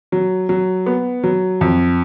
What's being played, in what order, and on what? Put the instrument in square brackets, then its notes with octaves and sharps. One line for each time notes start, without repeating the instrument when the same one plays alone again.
[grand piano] F#3
F#3
B3
F#3
F2